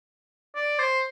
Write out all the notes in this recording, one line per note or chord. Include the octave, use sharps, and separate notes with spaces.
D5
C5